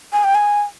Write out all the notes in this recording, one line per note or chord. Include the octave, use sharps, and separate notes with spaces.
G#5
G5
G#5